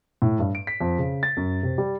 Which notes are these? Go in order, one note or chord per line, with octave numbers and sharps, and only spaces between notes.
A2
G2
D7
B6
F2
C#3
A6
F#2
C3
G3